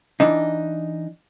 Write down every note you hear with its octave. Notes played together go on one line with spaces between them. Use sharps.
E3 D4 D#4